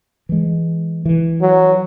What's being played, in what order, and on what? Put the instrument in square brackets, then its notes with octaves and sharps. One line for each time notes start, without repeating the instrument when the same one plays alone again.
[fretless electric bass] E3 G#3
E3
[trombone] F#3